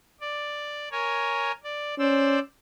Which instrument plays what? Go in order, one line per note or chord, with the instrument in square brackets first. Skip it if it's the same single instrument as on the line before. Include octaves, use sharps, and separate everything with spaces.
[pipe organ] D5
A#4 C#5 G#5
D5
[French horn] C#4 [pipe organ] C5 D5 E6